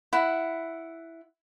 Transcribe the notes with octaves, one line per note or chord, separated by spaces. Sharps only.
E4 F#5